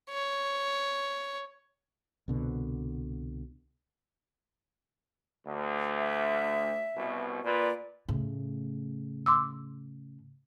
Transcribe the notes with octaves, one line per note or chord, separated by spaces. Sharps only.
C#5
C2 B2 D3
D2
E5
C2 B2
A#2 F4 B4 D5
A2 C#3
C6 D6 E6